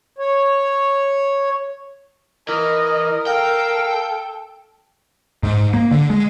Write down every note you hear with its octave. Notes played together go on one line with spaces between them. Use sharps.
C#5
E3 A#4 D#5
A4 F5 G5
G#2
A#3
D3
G#3